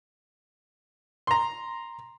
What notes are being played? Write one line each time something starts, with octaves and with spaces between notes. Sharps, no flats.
A#5 C6